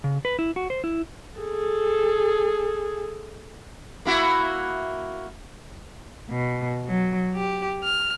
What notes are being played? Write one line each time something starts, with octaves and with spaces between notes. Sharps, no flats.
C#3
B4
E4
F#4
C5
E4
G#4 A4
A#3 E4 F#4
B2
F#3
G4
F6